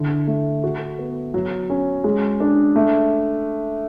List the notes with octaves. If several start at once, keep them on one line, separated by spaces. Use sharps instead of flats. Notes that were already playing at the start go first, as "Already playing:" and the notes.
Already playing: D3 E4
A3
F#4
B3
F#3
C#4
G#3
D4
A3